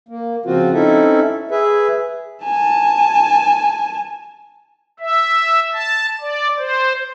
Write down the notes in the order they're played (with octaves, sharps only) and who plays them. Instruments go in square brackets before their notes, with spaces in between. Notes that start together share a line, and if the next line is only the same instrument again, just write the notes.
[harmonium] A#3
C#3 F3 C4 F4 F#4
C4 C#4 D#4 E4 A4 E5
G#4 B4 E5
[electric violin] G#5 A5
[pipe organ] E5
A5
D5
C5